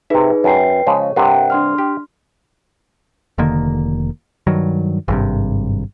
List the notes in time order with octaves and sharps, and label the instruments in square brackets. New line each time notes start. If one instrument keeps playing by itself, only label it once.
[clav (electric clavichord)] C3 E5 [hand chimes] D#4 G#4 B4
[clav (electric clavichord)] F#2 [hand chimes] B4 G5 C7
[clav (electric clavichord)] C#3 F3 G#3 [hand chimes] C#5
[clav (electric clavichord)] G2 C3 [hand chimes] A#4 F#5 G5
[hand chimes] D4 C6 F6
[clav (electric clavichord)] G4
[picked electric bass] F1 D3 D#3 A#3
G2 D#3 F#3
G#1 G2 C3